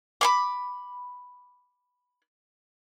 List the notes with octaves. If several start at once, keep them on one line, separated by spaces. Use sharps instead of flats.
B5 C6 D6